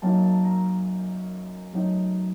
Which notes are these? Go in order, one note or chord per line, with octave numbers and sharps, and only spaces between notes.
F#2 F#3 A#3 D#4 A5
A5
A#5
F#2 F#3 A3 D#4